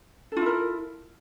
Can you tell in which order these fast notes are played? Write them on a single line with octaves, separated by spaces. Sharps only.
A4 F4 E4 A#4